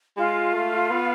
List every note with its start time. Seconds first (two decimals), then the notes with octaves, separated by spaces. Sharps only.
0.17 G#3 F4
0.54 A3
0.90 B3